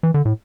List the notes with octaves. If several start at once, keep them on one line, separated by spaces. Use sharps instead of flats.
E3
D3
A2